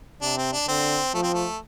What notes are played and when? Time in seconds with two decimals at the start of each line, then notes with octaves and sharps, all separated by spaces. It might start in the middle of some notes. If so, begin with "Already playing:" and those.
0.22 C3 D4
0.38 C4
0.53 D4
0.68 D3 C4
1.14 F3 A3
1.23 C4
1.34 A3